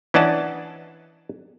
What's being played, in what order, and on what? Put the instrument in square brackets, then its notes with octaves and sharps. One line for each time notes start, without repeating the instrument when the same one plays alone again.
[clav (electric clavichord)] E3 C#4 D4 D#5 F#5 A5